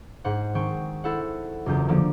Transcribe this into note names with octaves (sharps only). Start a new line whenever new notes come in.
G#2 C5 F#5
D#3 G#3 C4 G5 C#6
E4 A4 C5 F#5
F#1 E2 F4 G6
D3 F3 A#3